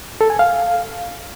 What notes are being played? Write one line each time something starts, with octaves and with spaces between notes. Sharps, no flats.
A4
G#5
F5